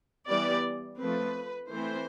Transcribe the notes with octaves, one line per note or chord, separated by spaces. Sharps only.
E3 G3 B3 D5
F3 A3 C4 B4
E3 A3 C4 C5